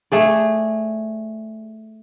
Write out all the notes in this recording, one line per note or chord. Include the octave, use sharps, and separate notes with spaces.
A3 G#4 D5